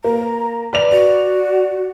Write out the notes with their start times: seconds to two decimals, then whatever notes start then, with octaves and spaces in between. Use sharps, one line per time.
0.04 A#3 A#5
0.73 B4 D5 F7
0.92 F#4 D5